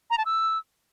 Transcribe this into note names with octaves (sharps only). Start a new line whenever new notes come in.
A#5
A5
E6